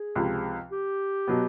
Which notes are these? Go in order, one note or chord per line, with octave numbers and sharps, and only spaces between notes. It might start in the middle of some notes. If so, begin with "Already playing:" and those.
Already playing: G#4
C#2 C3 F3
G4
B2 F#3 B3